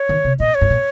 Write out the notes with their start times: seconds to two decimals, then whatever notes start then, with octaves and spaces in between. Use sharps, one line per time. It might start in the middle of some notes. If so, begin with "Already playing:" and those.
Already playing: C#5
0.09 D#3
0.25 C3
0.40 A#2 D#5
0.55 C#5
0.61 G#2
0.70 A#2